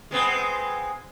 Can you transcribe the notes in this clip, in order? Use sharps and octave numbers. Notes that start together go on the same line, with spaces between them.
G#3 B3 C4